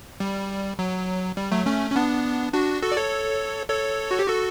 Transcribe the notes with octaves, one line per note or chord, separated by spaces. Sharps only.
G3
F#3
G3
F#3 A3
A3 C#4
C#4
B3 D4
D4 F#4
F#4 A4
D5
A4 C#5
A4 C#5
F#4
G4
F#4 A4